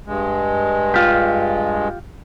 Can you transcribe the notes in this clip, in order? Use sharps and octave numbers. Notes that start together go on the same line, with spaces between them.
G2 G#3
F4 G4